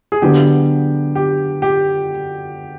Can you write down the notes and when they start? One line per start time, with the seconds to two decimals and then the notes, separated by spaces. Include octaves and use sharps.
0.12 G#4
0.22 D3 F#3 B3 G4
1.15 G4
1.62 G4